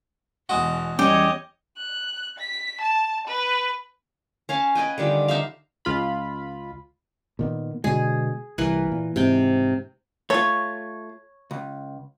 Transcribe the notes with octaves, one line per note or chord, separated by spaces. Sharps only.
E2 B2 G#3 F#4
E2 G3 C#4 G4 C#5 D#5
F#6
B6
A5
B4
C#4 F5 G#5 A5
B4 D#5 G5 G#5
D3 D#3 G3 F4
D4 D#4 E5 F5
C#2 F4 B5
A#2 D#3 B3
B2 D3 G#3 G#4
C2 E3 A#4 B4
A#2
G#2 C3 G5
A3 F4 C#5
C#2